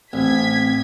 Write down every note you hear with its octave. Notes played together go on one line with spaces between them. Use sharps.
A1 C4 G#6 B6